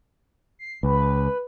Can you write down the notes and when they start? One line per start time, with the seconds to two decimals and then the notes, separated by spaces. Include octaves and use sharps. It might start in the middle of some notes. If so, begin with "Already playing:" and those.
0.59 C7
0.83 C#2 B4